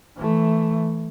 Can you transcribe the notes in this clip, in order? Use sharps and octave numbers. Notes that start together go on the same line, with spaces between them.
E3 A3